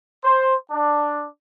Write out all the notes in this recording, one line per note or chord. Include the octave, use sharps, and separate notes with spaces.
C5
D4